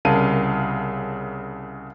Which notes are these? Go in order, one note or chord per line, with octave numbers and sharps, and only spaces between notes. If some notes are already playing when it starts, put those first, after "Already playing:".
C2 C#3 A#4 F5 A5 D#7